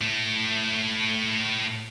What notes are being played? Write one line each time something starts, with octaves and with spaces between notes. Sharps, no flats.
A2 A3